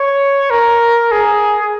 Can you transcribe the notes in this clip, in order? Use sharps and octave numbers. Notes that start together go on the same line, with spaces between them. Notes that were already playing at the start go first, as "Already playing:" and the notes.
Already playing: C#5
A#4
G#4